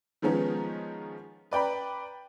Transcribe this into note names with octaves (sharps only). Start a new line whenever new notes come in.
D#3 F3 G#3 B3 C#4 D#4
B4 D5 G5 A#5 B5